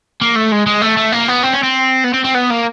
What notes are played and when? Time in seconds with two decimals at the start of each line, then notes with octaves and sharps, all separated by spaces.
0.21 A#3
0.36 A3
0.52 G#3
0.66 G#3
0.82 A3
0.97 A3
1.12 A#3
1.28 B3
1.43 C4
1.54 C#4
1.64 C4
2.04 B3
2.14 C4
2.25 C4
2.35 B3
2.51 A#3